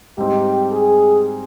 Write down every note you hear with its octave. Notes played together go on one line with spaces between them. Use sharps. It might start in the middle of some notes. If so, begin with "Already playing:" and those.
G#2 G3 C4 D#4 G4
G#4